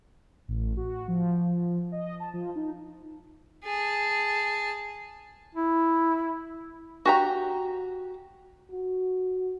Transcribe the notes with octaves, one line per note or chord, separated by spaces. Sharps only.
A1
F#4
F3
D#5
A5
F3
D#4
G#4 A5
E4
F#4 G4 A#5
F#4